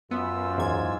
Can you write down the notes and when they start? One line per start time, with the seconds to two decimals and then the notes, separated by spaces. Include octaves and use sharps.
0.11 F#2 B3 F4 E6
0.58 E2 G#2 G#6